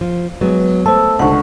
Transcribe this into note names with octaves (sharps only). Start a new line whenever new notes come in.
F3
F#3 G#3 B3
A3 C5 A5 E6
C#2 D3 F#5 C#6